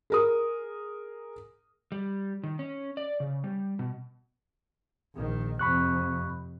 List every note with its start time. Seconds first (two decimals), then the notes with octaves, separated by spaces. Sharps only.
0.10 G#4 A#4 D#6
1.92 G3
2.44 D#3
2.59 C#4
2.97 D5
3.20 C#3
3.44 G3
3.79 B2
5.15 A#1 D#3
5.59 F2 C3 B5 C#6 F#6